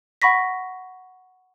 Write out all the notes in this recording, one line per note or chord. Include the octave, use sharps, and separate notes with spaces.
F#5 B5 C#6 A#6 B6